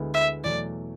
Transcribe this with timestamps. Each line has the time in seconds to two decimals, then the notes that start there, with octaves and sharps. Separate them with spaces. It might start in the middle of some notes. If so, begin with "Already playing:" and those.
Already playing: D2 D3 G#3 B3 E4
0.14 E5
0.44 E2 B2 F#3 A3 D5